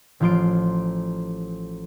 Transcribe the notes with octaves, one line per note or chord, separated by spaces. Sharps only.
A1 F3 F4 C6 D7